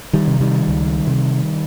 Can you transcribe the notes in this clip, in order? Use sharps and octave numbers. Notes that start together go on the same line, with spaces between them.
D#3 G3
C3
D#3 G3
C#2
C3